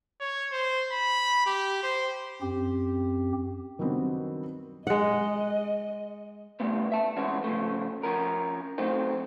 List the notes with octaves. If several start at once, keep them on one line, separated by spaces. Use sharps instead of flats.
C#5
C5
B5
G4
C5
F#2 C4 G4
D#3 F#3 G3 B3 C4 D4
G#3 D#5 F#5
C#3 G3 A3 B3
E5 A5
E2 G#3 B3 C#4
C#3 F3 A3
F3 C#4 A#4
F#3 A3 C4 D#4